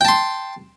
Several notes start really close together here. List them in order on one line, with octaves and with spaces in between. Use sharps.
G5 A5 C6